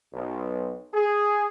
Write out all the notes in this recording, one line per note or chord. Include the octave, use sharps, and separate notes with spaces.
B1
G#4